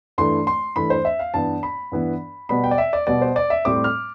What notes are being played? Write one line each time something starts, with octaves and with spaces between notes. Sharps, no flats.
G2 E3 A3 C6
C6
G2 E3 A3 B5
C5
E5
F5
G2 E3 B3 A5
B5
G2 E3 B3
B2 G3 B3 B5
G5
D5
E5
D5
B2 G3 B3 D5
C5
D5
E5
A2 G3 C4 D6
F6